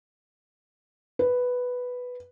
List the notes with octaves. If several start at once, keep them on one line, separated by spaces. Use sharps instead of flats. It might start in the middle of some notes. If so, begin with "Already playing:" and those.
B4